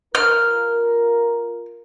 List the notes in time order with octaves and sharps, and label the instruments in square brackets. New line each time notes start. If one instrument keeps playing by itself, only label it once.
[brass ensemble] F4 A#4 [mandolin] F6